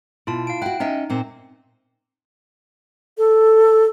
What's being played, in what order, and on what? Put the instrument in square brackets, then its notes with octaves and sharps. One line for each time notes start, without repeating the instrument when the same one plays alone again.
[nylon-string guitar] B2 [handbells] E4 F4 A5
[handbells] F5 D7
[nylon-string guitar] E4 F#4 [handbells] G5 F#6
[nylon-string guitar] C#4 D#5 E5 [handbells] D#4
[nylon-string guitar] A#2 C4
[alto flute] A4